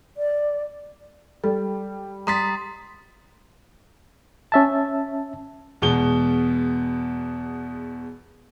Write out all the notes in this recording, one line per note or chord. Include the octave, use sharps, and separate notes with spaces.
D5
G3 A4
G3 A#5 C6 D#6 A6 B6
C#4 E5 A5
E2 B2 G#3 G7